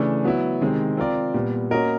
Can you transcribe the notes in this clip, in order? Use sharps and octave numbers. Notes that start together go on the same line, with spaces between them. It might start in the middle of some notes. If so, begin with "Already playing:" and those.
Already playing: C#3 E3 A3 D4
F#3 B3 E4
C3 D#3 G#3 C4
C4 F4 A#4 D5
A#2 G3 B3
A#3 C#4 F#4 A#4 D#5